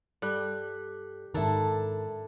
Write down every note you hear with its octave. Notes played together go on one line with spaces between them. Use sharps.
G2 G3 A4 F#6
G#2 D#3 D4 E4 A4 A#4 E5